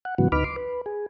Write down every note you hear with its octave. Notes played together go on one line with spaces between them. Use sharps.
F#5
G#2 C#3 E3 F#3 B3 F#4
D2 D#4 B4 B5 D6 F6
C6 D6
B4
G#4